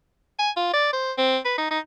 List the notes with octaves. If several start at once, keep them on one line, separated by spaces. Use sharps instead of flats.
G#5
F4
D5
C5
C4
B4
D#4
D#4